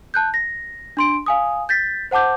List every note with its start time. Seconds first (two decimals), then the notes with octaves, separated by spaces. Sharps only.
0.14 A5 F#6 G6
0.34 A#6
0.97 D4 C6 D7
1.26 F5 G#5 D#6
1.69 G6 A6 B6
2.11 C5 F#5 A5 D6 G6